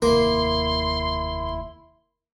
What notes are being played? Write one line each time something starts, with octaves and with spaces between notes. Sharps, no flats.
F1 D#2 A#3 E4 C6